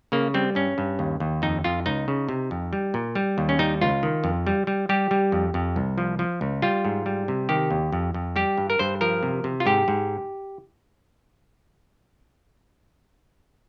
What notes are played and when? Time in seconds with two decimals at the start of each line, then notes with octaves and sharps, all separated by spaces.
0.12 C#3 A#3
0.34 G3 C4
0.55 G2 C#4
0.78 G2
0.99 D#2
1.20 D#2
1.42 F2 D#4
1.64 F2 F4
1.86 C#2 D#4
2.08 C#3
2.29 C3
2.51 F2
2.73 G3
2.94 A#2
3.15 G3
3.38 D#2
3.49 C#4
3.59 G3 D#4
3.81 C#2 F4
4.03 D#3
4.24 F2
4.47 G3
4.67 G3
4.89 G3 G4
5.11 G3
5.32 F2
5.54 F2
5.76 C2
5.98 F3
6.19 F3
6.41 C#2
6.62 G3 F4
6.85 G#2
7.06 G3
7.28 C3
7.49 D#3 G4
7.71 D#2
7.92 F2
8.14 F2
8.36 G3 G4
8.57 G2
8.70 A#4
8.79 G2 C5
9.01 F3 A#4
9.23 C3
9.44 C3
9.60 F4
9.66 G#2 G4
9.88 G#2